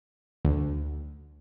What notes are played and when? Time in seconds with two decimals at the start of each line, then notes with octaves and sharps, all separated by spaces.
0.45 D2